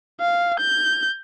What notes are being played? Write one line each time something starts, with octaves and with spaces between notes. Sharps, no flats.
F5
G6